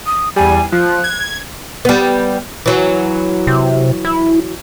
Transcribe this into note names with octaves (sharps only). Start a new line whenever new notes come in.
D#6
E2 G3 G#5
F3 F#6
G#6
G3 B3
E3 F#3
C3
E4